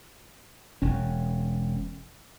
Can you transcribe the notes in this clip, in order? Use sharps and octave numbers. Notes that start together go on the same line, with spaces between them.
E1 C#4